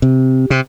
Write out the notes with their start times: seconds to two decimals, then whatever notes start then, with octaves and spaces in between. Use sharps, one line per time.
0.02 C3
0.50 C3